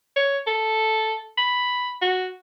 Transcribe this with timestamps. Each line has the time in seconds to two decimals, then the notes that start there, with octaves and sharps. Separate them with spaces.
0.16 C#5
0.47 A4
1.38 B5
2.02 F#4